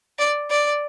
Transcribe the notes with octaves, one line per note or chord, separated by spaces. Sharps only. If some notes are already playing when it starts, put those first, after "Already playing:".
D5
D5